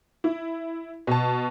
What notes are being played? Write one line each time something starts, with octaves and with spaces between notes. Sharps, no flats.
E4
B2 A5